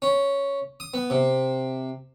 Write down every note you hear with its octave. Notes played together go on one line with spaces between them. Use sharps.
C#4
D#6
B3
C3